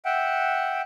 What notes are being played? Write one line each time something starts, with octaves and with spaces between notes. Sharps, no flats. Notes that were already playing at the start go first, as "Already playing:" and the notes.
E5 F#5 G5